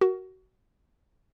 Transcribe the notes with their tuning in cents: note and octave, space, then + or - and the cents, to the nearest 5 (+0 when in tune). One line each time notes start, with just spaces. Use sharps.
F#4 +20 A#4 +0